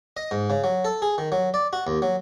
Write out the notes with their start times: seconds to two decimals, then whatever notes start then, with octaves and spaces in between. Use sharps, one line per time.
0.17 D#5
0.31 G#2
0.50 C#3
0.64 F#3
0.85 A4
1.02 G#4
1.18 D#3
1.32 F#3
1.54 D5
1.73 F#4
1.87 D#2
2.02 F#3